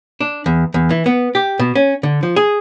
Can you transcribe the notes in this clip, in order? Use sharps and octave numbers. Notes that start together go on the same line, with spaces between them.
D4
E2
E2
E3
B3
G4
B2
C#4
D3
F3
G#4